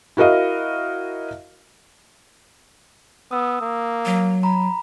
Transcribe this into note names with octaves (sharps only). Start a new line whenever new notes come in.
E4 F#4 A#4 D#5 F5
B3 D#6 E6
A#3
F#3
A#5 B5